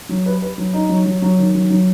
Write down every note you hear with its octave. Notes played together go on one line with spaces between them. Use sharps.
F#3
B4
B4
F#3
D#4
F#3
F#3
F#3
D#3
F#3
F#3